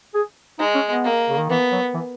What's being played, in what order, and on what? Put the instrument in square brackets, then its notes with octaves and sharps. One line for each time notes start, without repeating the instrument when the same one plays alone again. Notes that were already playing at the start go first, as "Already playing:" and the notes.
[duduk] G#4
[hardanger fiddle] G#3 [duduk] D#4
[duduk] C#4
B3
[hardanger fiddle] A#3
[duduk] C#3
D#3
[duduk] E3 [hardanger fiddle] B3
[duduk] F#3
E3